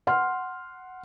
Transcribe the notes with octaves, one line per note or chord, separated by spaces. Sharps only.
F#5 C6 F6